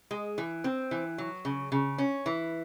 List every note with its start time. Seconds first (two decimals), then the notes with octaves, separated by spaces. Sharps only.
0.11 G#3
0.38 E3
0.64 C4
0.91 E3
1.18 F#3
1.45 C#3
1.72 C#3
1.98 C#4
2.26 E3